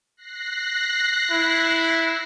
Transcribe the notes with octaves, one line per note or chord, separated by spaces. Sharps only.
F#6 A#6 C7
E4